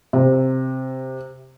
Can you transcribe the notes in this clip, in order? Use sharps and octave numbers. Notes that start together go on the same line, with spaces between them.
C3